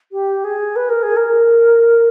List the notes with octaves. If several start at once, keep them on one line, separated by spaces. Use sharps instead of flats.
G4
G#4
B4
A#4
G#4
A#4